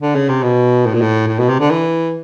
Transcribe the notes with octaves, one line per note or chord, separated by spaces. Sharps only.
D3
C#3
C3
B2
A2
A#2
A2
A2
B2
C3
D3
E3